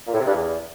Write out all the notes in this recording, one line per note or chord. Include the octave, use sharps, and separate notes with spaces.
A#2
A2
C3
G2
E2